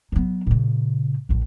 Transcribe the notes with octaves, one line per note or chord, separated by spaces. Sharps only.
F#3 B3
A#2 C#3
A#1 F2